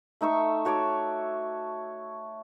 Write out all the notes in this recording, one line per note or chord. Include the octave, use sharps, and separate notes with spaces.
A3 D#4 E5 C#6
F#4 C#5 A5 D6